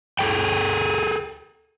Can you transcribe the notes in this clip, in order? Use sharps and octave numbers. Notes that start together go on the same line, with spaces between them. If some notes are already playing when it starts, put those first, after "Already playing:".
G#4 A4 G5